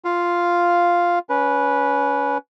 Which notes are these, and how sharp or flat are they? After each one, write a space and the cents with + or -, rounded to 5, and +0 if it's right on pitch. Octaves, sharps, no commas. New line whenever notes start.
F4 +0 F5 +0
C#4 +20 B4 -10